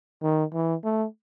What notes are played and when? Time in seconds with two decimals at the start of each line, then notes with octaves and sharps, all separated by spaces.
0.23 D#3
0.53 E3
0.84 A3